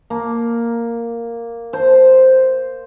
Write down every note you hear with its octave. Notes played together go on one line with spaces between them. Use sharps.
A#3
C5